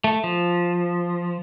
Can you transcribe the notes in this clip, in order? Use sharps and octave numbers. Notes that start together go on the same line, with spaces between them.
A3
F3